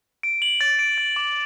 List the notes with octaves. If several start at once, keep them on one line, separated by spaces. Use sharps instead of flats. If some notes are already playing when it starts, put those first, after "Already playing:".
D7
F#7
A6
D7
A6
D6